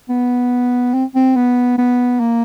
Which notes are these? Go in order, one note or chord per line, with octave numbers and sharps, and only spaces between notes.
B3
C4
C4
B3
B3
A#3